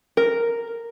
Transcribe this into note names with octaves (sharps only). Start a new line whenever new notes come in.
A#4